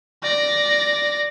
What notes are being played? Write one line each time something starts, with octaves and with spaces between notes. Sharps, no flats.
D5 A#6